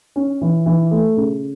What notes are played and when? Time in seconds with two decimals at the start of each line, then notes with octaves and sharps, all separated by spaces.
0.16 C#4
0.41 E3
0.66 E3
0.91 A3
1.17 C#3